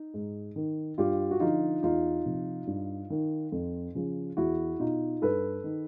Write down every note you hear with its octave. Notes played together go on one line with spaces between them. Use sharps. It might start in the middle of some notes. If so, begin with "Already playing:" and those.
Already playing: D#4
G#2
D#3
G2 F4 G4
F#4
D3 F3 D#4 F4
E2 D#4 F4
C3 F3
G2
D#3
F2
C#3 F3
E2 E4 F#4
B2 D#4 F4
G2 A4 B4
D#3